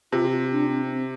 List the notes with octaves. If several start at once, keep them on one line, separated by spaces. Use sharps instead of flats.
C3 F4
F4
D4
C4
C4